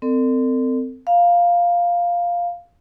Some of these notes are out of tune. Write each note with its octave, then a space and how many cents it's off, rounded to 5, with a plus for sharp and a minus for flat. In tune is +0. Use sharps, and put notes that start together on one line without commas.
C4 -25 A4 +40 D5 +40
F5 +0 A#5 +20